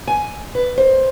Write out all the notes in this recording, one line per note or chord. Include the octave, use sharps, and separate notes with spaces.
G#5
B4
C5